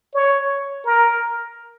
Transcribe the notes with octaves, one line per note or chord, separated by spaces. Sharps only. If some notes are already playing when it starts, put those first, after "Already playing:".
C#5
A#4